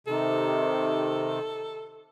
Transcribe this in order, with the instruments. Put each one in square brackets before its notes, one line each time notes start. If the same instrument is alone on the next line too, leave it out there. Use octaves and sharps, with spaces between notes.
[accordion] C3 D#3 [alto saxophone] A4